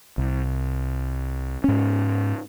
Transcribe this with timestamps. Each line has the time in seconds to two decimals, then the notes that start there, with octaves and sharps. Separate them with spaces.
0.18 C2
1.64 G#2 C#4